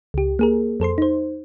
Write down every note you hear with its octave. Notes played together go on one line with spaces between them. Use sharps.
C#2 G4
A#3 G#4 A#4
F2 A4 C5 C6
D#4 C5